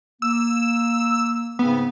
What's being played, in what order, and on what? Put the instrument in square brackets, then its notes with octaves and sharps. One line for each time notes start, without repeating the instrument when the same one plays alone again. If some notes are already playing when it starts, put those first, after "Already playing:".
[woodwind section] A#3 [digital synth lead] E6
[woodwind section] G#2 C#3 C4 [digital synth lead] B3